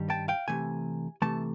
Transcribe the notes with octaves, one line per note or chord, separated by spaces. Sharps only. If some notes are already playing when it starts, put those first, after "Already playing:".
Already playing: G2 D#3 G3
G5 A5
F5 G5
C3 E3 A3 G#5
C3 E3 A3 A5